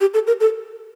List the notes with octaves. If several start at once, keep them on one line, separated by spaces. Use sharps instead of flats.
G4
A4
A#4
A4